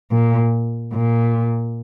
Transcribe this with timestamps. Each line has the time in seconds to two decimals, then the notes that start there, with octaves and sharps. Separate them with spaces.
0.11 A#2
0.93 A#2